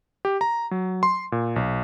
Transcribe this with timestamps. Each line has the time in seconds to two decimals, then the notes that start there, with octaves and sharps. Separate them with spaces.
0.25 G4
0.41 A#5
0.71 F#3
1.03 C6
1.32 A#2
1.56 B1